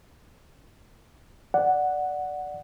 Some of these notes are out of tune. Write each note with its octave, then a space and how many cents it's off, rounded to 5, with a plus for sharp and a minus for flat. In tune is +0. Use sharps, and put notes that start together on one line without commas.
D5 +0 F#5 +0